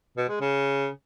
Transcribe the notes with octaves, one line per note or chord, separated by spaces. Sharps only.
B2
G#3
C#3